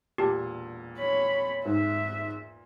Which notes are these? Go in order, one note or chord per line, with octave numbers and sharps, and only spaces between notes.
E1 A#2 G4 A5
C#5 B5
G#2 E5